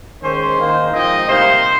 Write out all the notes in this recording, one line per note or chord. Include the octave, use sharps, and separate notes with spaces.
D#3 G#3 C#4 C5
D#3 A#3 D#4
G#2 F3 C4 D#4 D#5
C3 G3 A#3 D#4 C5